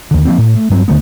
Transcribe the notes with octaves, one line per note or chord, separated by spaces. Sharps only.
D#2 D3
F3 G3 A#3 C4
A2
A3
G2 F#3 C4
D#2 D3 A3 B3